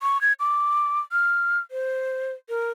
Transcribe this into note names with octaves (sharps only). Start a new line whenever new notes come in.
C#6
G#6
D6
F6
C5
A#4